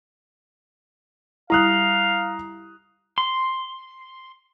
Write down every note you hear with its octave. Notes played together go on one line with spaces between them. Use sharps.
G3 E4 F5 A#5 D#6 F#6
C6